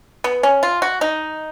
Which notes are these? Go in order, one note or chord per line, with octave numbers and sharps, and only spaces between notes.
B3
C#4
F4
F#4
D#4